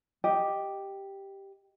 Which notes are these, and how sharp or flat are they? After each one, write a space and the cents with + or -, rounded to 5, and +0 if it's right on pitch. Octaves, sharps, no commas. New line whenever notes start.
G4 +0 D#5 +0